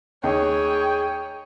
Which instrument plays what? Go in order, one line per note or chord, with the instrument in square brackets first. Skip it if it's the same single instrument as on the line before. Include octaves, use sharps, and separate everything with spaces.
[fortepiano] D#2 [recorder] G#4 [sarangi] C#5 [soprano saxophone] G5